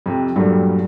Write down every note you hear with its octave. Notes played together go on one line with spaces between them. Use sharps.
F2 C3
G2 A#2 F#3 G3 A3